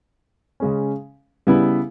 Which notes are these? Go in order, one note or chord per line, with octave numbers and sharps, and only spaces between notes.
C#3 G#3 C#4
C#3 G3 B3 E4